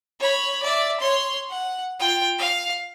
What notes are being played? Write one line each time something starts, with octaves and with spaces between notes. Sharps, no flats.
C#5 B5
D5 E5
C#5 C6
F#5
F4 G5
F5